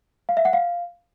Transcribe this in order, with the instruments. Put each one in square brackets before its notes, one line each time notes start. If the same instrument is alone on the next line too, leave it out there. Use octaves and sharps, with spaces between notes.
[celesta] F5
E5
F#5
F5